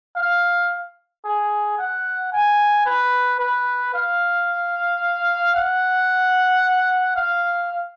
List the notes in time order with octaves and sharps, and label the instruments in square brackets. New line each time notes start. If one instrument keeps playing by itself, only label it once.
[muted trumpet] F5
G#4
F#5
G#5
B4
B4
F5
F#5
F5